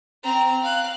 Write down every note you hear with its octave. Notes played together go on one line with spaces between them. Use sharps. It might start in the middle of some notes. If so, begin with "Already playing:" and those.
C4 A#5
F5 F#6